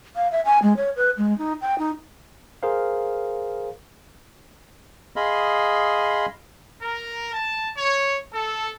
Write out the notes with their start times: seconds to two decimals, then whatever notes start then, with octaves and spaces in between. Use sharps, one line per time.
0.16 F5
0.32 E5
0.45 G#5
0.62 G#3
0.77 C#5
0.96 B4
1.17 G#3
1.38 D#4
1.62 G5
1.79 D#4
2.63 G#4 A#4 C5 F5
5.16 G#4 D#5 F5 B5 C6
6.82 A#4
7.33 A5
7.77 C#5
8.33 A4